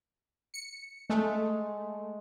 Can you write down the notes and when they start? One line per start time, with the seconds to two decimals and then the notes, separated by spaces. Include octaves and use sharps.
0.54 C#7
1.10 G#3 A3